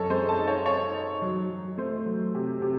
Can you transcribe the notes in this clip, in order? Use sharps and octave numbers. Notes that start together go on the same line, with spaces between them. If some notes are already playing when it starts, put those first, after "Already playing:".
Already playing: F#2 A4 C#5 D#5
G#3 C5
A5
D#4
C#5
D#4 C#5
D#4
F#3
F#3
A3 C5
F#3
C3
C3